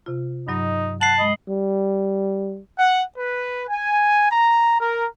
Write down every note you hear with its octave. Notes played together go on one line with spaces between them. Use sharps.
C3 F4
G2 F#3 D#4 D#5
F#5 A5 C7 F#7
G#3 D#5 B5
G3
F#5
B4
G#5
A#5
A#4